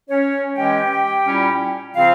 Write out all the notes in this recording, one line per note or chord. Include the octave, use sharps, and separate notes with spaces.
C#4 C#5
E3 G#3 C#4 G4 G5
A#2 G3 C#4 E4
C#3 F3 C4 F4 F5